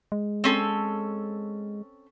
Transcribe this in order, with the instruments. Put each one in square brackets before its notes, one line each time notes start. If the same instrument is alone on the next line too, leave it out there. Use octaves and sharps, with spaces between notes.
[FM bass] G#3
[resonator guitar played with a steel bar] C4 C#4 A4